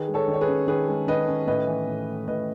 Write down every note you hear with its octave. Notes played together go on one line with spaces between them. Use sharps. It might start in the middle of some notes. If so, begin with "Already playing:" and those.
Already playing: D#3 G#4 B4
G#3
A4 C#5
D#3
C#5
G#4 B4
C#4
D#3 G#4 B4
G#3
D#3 B4 D#5
C#4
A2 B4 D#5
E3
A2
A3
A2 B4 D#5